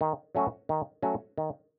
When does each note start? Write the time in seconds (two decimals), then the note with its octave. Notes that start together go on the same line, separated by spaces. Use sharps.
0.01 D#3
0.35 F#3 A3 C#4 F#4
0.69 D#3
1.03 F#3 A3 C#4 F#4
1.38 D#3